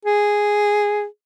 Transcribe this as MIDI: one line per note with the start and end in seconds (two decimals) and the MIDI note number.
0.05 1.05 68